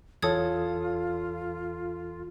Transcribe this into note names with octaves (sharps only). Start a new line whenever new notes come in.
E2 E3 F4 A4 C#5 D#6 G#6